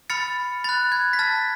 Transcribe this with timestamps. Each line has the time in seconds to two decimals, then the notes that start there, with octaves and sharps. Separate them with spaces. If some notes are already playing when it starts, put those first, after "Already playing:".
0.10 B5 F6 A6 C#7
0.64 B5 F#6 A6
0.92 G#6
1.13 B6
1.19 A5 F6 A6